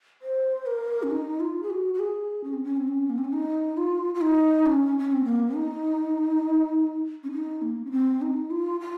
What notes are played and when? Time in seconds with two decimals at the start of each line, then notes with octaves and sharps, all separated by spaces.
0.22 C5
0.66 A#4
1.03 C#4
1.11 D#4
1.40 F4
1.63 G#4
1.70 F#4
1.94 F#4
1.99 G#4
2.44 C#4
2.53 C4
2.64 C#4
2.77 C4
2.88 C#4
3.10 A#3
3.18 C4
3.24 C#4
3.33 D#4
3.77 F4
4.15 F4
4.21 D#4
4.66 C#4
4.99 C#4
5.12 C4
5.25 A#3
5.55 D#4
7.24 C#4
7.32 D#4
7.62 A#3
7.85 C#4
7.91 C4
8.22 D#4
8.51 F4
8.80 F4